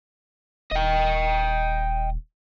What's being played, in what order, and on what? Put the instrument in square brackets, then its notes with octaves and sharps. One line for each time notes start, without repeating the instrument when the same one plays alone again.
[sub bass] D#1 [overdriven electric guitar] D#5 G5